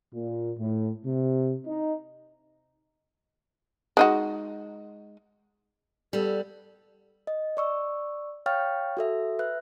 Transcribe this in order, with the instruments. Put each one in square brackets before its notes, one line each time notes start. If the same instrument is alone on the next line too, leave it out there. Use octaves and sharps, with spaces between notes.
[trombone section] A#2
A2
C3
D#4
[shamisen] G#3 D#4 F#4
[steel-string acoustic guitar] G3 B3 [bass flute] A4
[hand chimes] D#5
D5 C#6 E6
C#5 F5 G5 C#6 F6 A6
F#4 A4 E5
B4 E5 F#6